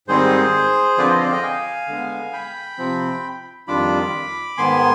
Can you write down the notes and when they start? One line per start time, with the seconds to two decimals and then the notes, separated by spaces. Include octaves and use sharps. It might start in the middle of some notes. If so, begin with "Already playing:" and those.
0.08 G#2 D#3 G3 C4 D#4 G#4 C5
0.98 D3 F3 C4 F4 B4 D5
1.10 C5 D#5
1.20 D5 F5
1.32 D#5 G5
1.43 F5 G#5
1.88 D3 G#3 B3
2.33 G5 B5
2.78 C3 F3 C4
3.67 F2 D#3 G3 D4 F4 B5 D6
4.58 G#2 D#3 B3 G#5 C6